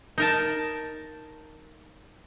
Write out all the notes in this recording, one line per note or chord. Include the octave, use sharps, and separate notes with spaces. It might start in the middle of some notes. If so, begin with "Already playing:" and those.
D#4 A#4 A5